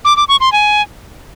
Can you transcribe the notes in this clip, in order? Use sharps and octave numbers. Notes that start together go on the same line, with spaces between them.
D6
D6
C#6
C6
G#5